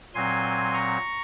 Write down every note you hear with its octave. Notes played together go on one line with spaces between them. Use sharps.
A#2 F#3 C4 G#5 C6
A#5 C#6